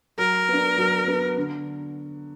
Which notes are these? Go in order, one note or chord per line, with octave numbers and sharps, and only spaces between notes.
F#3 A#4
B3 D4
F#3
B3 D4
D3